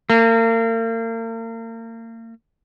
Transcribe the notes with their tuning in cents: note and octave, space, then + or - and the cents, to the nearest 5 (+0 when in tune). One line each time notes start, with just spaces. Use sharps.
A#3 -40